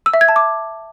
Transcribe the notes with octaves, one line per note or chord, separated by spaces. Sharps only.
E6
E5
G#6
A5
D6